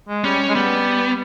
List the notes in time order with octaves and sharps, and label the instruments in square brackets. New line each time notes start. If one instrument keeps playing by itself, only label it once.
[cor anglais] G#3
[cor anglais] G3 [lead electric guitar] C#4
[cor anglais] G#3
[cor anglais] G3 [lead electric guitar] B3